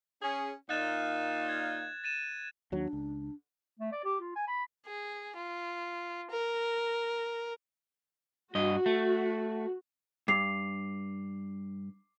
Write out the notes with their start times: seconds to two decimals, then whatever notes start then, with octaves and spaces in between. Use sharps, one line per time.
0.22 C#4 G#4
0.70 A#2 D#4 F5 F#6 A6 E7
1.49 G#6
2.04 A6 D#7 E7
2.72 D#2 F#3 D4
2.93 C#2
3.80 A3
3.92 D5
4.04 G4
4.20 F4
4.35 G#5
4.47 B5
4.86 G#4
5.37 F4
6.31 A#4
8.55 G2 F#4 D#5
8.86 A3
10.28 G2 D6 C7 F7